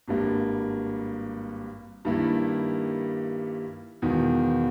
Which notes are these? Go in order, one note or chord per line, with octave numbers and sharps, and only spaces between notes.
G#1 G2 G3 A#3
G2 D#3 G3 A#3 E4
E1 E2 D#3